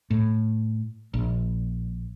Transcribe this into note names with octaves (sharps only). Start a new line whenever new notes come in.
A2
A#1